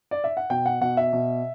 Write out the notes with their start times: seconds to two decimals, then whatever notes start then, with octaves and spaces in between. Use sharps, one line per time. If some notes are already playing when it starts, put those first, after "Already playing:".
0.11 D5
0.24 E5
0.37 F#5
0.50 B2 G5
0.66 F#5
0.81 B2 F#5
0.97 E5
1.13 B2